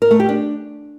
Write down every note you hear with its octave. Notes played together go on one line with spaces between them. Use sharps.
A#4
A3
G4
D4